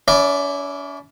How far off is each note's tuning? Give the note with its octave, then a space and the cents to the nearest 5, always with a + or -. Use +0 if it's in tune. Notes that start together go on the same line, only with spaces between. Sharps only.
C#4 +40 E4 -10 D5 +0